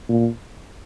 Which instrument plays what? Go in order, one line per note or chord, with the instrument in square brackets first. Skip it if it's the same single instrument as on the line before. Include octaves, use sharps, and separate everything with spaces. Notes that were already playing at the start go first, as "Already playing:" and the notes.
[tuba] A#2